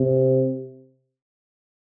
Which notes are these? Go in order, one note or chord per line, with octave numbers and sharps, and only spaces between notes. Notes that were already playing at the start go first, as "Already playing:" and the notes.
Already playing: C3